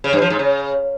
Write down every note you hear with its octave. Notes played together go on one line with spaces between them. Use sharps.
C#3
G2
F3
G#2
C#3